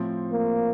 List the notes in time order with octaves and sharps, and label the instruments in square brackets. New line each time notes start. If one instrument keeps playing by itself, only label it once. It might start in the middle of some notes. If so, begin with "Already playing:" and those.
Already playing: [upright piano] A2 F3 C4
[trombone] A#3